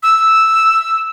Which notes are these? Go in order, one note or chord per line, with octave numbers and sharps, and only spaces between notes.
E6